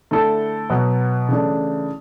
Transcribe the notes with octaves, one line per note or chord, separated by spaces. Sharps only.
D3 A3 E4 A4
B2 F#3 B3
C#3 E3 A3 D4